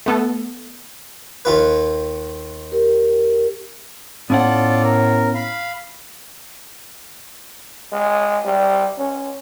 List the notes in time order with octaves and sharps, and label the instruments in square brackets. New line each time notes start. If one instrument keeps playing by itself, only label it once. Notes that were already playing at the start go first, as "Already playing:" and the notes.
[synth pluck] A3 B3 A4
[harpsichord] D#2 F4 B4
[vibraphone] G4 A#4
[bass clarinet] A2 [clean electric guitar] B3 C#4 F#5 [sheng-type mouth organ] F4 A4 D5
[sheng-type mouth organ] A#4
F5 B5
[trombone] G#3
G3
C#4